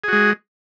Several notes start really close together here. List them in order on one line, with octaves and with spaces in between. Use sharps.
G#4 F#4 G#3